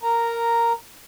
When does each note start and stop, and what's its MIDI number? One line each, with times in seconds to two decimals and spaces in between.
0.03 0.73 70
0.03 0.73 82